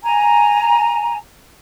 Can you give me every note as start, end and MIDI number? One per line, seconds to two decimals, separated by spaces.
0.03 1.17 80
0.03 1.17 82